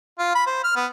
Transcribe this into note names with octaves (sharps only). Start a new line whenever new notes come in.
F4
B5
C5
F6
B3